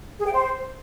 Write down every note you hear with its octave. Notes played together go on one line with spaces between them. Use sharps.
G#4
G5
C5